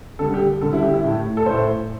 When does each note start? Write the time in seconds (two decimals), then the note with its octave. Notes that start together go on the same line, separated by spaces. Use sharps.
0.19 D3 G3 A4
0.34 G4
0.61 D3 G3 A4
0.73 E4
0.83 G4
0.94 E4
1.04 A2 A3
1.37 A4
1.46 A2 A3 C5